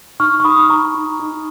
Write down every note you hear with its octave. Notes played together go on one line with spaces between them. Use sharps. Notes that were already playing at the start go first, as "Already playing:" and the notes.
D#4 C#6 F6
C#6
D#4 B5 D#6
D#4 A#5 C#6
D#4
D#4